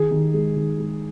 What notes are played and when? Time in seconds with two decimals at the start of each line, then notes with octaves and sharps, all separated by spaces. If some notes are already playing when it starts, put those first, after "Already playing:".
Already playing: D#3 G#4
0.11 D#3
0.34 G#3
0.56 D#3
0.79 G#3